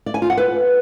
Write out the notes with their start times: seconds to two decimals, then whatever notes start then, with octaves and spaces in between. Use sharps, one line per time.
0.06 D5
0.14 G#5
0.22 F4
0.30 F#5
0.37 B4